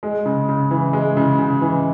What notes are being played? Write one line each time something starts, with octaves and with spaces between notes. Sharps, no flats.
G#3
C#3
C#3
E3
G#3
C#3
C#3
E3